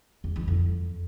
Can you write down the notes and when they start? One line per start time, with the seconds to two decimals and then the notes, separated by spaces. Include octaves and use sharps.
0.24 E2
0.36 E3
0.48 F2